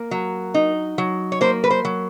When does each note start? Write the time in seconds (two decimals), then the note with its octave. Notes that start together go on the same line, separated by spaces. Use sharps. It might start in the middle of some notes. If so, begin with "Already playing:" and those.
Already playing: A#3
0.11 F#3
0.54 D#4
0.98 F#3
1.32 C#5
1.41 A#3 C5
1.64 B4
1.70 C5
1.85 F#3